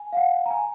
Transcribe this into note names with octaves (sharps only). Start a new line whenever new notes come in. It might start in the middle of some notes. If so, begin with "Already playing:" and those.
Already playing: G#5
F5
F#5
A#5
G#5